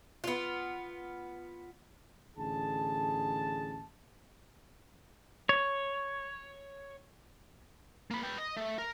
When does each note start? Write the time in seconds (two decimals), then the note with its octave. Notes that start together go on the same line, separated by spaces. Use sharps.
0.24 B3 F4
2.38 A1 D3 G#4 A5
5.49 C#5
8.11 A#3 B5
8.23 B4 G5
8.38 D#5
8.57 A3
8.79 A#4